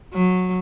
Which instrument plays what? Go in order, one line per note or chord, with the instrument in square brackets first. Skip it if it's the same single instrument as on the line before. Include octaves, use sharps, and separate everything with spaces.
[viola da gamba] F#3